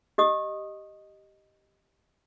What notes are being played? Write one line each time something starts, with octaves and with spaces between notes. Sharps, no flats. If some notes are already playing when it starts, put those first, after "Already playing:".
G4 D#5 D#6